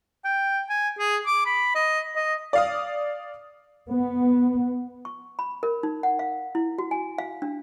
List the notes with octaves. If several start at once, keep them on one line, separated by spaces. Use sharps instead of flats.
G5
G#5
G#4
D6
B5
D#5
D#5
D5 F5 D#6
B3
C#6
B5
A#4
D#4
F#5
F5
E4
F#4
G#5
F5
D4